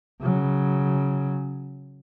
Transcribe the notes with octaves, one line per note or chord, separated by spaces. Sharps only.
C#3 F#3